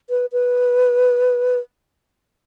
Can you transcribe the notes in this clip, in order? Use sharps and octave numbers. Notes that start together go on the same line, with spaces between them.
B4
B4